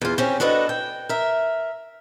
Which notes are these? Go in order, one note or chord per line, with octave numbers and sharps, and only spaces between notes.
E2 F4
C4 C#4 G4
D4 F#4 A4 B4 D#5
G5
A#4 E5